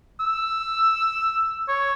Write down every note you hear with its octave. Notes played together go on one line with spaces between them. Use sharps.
E6
C#5